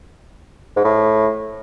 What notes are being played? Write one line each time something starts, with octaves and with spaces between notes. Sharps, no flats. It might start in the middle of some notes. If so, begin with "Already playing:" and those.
G#2
A2